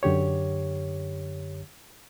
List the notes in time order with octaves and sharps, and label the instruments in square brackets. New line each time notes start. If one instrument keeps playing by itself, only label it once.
[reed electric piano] F#2 D3 G4 C#5